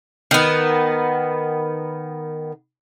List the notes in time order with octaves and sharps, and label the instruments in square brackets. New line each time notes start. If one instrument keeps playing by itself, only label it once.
[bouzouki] D#3 B3